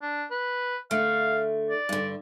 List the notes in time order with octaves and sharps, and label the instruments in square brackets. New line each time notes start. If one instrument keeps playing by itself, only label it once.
[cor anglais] D4
B4
[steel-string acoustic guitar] D3 A3 [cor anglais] F5
[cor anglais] D5
[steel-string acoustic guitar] G2 D3